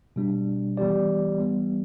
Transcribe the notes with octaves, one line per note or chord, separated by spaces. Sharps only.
B2 G3 D4
E3 G3 B3 G4 D5
E3 G3 B3